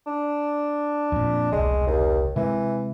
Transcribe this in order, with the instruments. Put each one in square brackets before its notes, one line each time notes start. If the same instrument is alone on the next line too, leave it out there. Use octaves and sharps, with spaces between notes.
[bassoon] D4
[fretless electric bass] F2 A#2
[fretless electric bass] E1 C2 [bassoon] G#3
[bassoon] D#2
[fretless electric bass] C3 G#3 [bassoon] E3